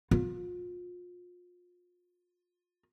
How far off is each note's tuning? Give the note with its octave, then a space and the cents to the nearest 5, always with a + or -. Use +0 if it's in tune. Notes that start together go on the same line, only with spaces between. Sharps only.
F4 +30